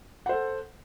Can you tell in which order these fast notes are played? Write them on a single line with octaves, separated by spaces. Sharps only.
F#5 C5 A4